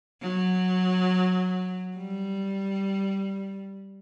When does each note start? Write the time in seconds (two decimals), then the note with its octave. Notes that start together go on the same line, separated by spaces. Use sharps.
0.21 F#3
1.97 G3